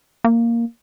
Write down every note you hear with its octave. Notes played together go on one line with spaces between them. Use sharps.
A#3